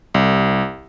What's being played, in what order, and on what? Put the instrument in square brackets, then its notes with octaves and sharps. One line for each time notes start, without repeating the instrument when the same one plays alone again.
[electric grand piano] C2